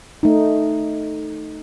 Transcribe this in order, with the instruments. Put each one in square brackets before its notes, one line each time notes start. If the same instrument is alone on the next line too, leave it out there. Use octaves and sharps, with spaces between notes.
[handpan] A3 D#4